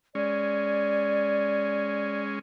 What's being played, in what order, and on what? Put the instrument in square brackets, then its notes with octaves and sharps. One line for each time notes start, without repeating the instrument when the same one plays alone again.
[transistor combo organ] G#3 C#4 [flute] D5